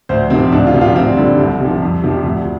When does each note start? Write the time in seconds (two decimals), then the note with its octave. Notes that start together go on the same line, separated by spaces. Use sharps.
0.09 D2 C5
0.30 C3 F3 C4
0.52 D2 D4
0.67 F4
0.74 C3 F3
0.81 F4
0.96 D2 C4
1.17 D3 G3
1.39 C2
1.60 C3
1.65 F3
1.82 F2
2.03 C3 F3
2.25 D2